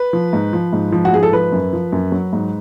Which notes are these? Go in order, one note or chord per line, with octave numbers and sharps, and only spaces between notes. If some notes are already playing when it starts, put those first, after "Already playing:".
Already playing: B4
F3
G#2
F3
G#2
F3
F#4
G#2 G#4
A4
F3 B4
F#2
F3
F#2
F#3
G#2